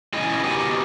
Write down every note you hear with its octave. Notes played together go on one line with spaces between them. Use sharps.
C#3 G#3 E4 D#5 G5 G#5
B3 D#4 F#4 G4 A#4 G#5